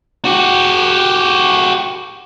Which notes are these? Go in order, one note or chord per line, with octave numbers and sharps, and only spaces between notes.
F#4 G4